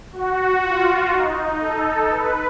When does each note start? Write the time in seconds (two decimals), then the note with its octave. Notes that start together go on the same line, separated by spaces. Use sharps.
0.12 F#4
0.63 F4
1.11 D#4
1.60 A4
2.10 B4